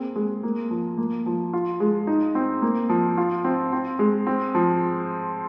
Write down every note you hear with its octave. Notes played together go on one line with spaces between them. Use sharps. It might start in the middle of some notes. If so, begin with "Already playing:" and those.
Already playing: A#3 C4 G#4
G#3
A#3
F3
A#3
F3
F4
G#3
D#4
C4
A#3
F3
F4
C4
C4
G#3
C4
F3